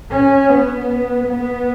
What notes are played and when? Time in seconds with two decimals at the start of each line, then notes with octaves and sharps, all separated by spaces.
0.11 C#4
0.50 B3
1.27 B3